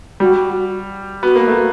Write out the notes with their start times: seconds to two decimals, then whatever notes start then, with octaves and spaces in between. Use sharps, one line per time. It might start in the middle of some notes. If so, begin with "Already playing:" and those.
0.20 G3 F#4
1.23 B3 F#4
1.36 A#3
1.48 A3